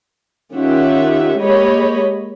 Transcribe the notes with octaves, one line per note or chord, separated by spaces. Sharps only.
D#3 C#4 F4 G4 E5 F#5
G#3 A#3 G4 C#5 D#5 B5